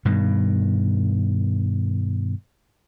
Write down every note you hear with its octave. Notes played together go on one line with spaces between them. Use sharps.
G2 B2 D#3